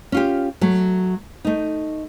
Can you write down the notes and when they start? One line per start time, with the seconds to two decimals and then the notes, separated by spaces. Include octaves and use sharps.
0.12 C#4 F4 G4
0.61 F#3 A3
1.45 A3 D#4